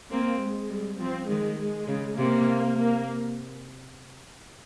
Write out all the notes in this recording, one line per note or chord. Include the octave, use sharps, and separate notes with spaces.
A#3 C4
G#3
G3
F3 C4
D#3 G#3
G#3
C#3
C3 A#3
A#3